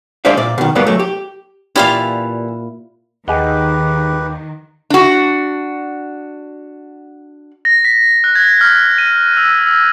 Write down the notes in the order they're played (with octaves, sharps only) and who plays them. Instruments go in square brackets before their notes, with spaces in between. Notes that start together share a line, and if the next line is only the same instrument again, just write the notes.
[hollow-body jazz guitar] G#3 D4 C5 D5 E5 F5
A#2 D5
B2 D#3
C#2 G2 B2 G3 A#3 B3
F#3 A3
G4
[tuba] A#2 [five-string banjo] E3 G4 D5 [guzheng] E4 F4 F5
[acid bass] D#2 [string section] D#3 [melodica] G4 B4 [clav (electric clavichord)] G#4 D#5 F#5
[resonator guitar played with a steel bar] D4 F#4
[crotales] A#6
B6
F#6
G#6
F6
D#7
E6
E6